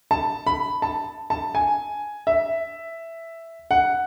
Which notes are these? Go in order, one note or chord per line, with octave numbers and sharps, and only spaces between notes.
A5
B5
A5
A5
G#5
E5
F#5